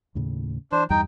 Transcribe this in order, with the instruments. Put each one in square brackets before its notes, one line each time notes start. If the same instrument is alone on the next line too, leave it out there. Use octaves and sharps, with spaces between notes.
[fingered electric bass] D#2 A2 C#3
[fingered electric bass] E3 [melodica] D4 C5
[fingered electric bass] E2 G2 G3 [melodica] D#4 G5